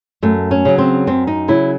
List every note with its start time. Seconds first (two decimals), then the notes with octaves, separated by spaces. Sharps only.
0.23 F#2 A3
0.51 C#4
0.65 C#3 F#3
0.78 C4
1.07 F#2 C4
1.27 D#4
1.48 C#3 F#3 E4